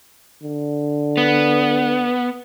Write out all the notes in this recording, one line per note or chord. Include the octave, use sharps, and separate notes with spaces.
D3
B3